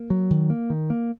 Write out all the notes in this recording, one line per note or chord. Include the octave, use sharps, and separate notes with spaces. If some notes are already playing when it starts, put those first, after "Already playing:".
Already playing: A#3
F#3
D#3
A#3
D#3
A#3